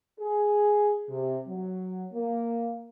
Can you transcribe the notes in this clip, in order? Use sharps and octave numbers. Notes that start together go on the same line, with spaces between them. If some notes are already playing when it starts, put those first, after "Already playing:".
G#4
C3
F#3
A#3